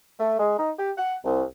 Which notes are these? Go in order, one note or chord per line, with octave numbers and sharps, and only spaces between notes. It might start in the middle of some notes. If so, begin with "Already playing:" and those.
A3
G#3
D#4
G4
F#5
C2